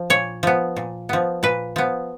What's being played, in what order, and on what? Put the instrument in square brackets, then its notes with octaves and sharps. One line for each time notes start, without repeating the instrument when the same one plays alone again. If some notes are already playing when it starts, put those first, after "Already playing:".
Already playing: [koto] F3
A#2 C#5
F3 B3
A#2
F3 B3
A#2 B4
F3 B3